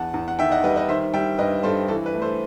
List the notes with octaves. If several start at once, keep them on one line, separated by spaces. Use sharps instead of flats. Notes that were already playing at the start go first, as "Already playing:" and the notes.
Already playing: E2 F#5 A5
E2
F#5
D#3 E5 G5
D#5 F#5
G3 B4 D#5
B4 D#5
D#3 C5 E5
G3 E5 G5
G2 B4 D#5
G2 A4 C5
E3 A4
B4
A3
A4 C5